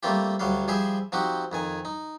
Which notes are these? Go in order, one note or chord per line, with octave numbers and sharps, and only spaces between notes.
G3 A3 A#3 C4 F4 G4
D2 F#3 G3 F5
F3 G3 G#4 C5 E5
F3 C4 D#4 F#4 G4
F2 D#3 G#5
D#4